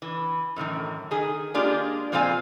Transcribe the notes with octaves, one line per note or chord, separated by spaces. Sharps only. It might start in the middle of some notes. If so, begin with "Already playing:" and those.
E3
F#2 A2 D#3 E3
D#3 G#4
G#3 A#3 D4 F4 G4 G#4
A#2 F3 C4 F4 F5 G#5